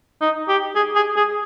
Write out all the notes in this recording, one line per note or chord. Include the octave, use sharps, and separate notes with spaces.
D#4
G4
G#4
G#4
G#4